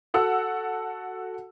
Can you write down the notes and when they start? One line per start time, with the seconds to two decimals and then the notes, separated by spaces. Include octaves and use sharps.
0.14 F#4 A4 F#5 E6